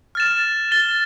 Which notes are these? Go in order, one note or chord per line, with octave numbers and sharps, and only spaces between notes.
F6 A6 E7
A6 E7 G7